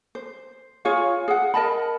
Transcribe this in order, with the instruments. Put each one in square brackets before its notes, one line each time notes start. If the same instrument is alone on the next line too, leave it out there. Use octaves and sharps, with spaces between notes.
[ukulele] C5
F4 G#4 C#5 F5
G#4 F#5
A#4 D#5 A5 B5